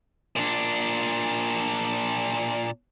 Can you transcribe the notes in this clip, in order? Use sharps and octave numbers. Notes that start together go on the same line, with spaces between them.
A#2 D4